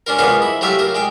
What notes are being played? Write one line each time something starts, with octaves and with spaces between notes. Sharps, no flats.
C#4 D4 F4 A#4
F3 G#3 A#3 B3 F4 F#4
E4
F#3 A3 F4 G4 E5 F5
F4 A#4
G#3 G5 D6